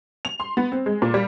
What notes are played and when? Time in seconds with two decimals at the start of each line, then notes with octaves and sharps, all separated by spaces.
0.25 F7
0.40 C6
0.57 B3
0.72 C4
0.86 G#3
1.02 A#2
1.14 G3